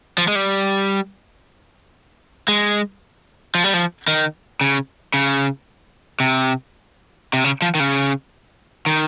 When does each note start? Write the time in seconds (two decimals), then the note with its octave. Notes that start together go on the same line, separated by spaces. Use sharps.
0.18 F3
0.28 G#3
0.35 G3
2.48 G#3
3.55 F3
3.64 G3
3.74 F3
4.08 D#3
4.61 C#3
5.14 C#3
6.20 C3
7.33 C3
7.44 C#3
7.62 F3
7.75 D#3
7.80 C#3
8.86 D#3